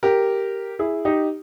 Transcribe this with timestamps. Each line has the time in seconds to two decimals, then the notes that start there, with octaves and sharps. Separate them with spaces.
0.03 G4 A#4
0.79 E4 G#4
1.05 D#4 G4